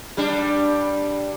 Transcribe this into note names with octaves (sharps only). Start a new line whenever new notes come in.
G3 D4